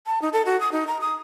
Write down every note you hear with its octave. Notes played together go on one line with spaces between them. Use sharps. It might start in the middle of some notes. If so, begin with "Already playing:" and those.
A5
D#4
A4
F#4
D#6
D#4
A#5
D#6